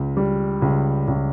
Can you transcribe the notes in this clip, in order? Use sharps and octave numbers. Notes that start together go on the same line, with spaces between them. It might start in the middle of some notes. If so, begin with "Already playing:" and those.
Already playing: C#2
G3
C#2
C#2